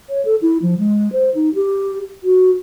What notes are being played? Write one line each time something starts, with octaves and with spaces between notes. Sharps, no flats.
C#5
A4
E4
F3
G#3
C5
D#4
G4
F#4